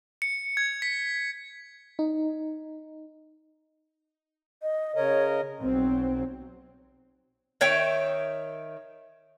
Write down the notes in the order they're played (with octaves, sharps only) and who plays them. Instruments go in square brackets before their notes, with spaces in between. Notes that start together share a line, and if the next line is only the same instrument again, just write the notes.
[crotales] C#7
G#6
B6
[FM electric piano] D#4
[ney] D#5
[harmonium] C#3 A#4 D#5 [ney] C#5
[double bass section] B1 F#3 C4
[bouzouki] D#3 C#5 E5 G5